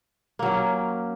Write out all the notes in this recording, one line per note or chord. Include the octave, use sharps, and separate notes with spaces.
F#3 A#3 C#4